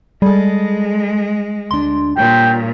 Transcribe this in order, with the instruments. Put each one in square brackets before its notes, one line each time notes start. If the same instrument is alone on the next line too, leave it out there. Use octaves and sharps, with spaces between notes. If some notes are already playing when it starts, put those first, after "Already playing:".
[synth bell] G3 [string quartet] G#3 [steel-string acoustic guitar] G#4 A4
[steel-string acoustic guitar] D2 D4 [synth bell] C6
[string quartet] A#2 [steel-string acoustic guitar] G3 C#5 [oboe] G5